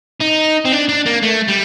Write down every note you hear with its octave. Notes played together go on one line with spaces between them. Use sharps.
D#4
C4
D4
D4
A#3
A3
G3